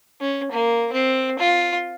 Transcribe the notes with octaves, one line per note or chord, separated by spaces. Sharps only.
C#4
A#3
C4
F4